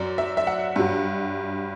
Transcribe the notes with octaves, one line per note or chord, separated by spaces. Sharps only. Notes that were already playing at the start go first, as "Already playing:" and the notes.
Already playing: F#2 F#3 D5
E5
E5
F#5
G2 F#3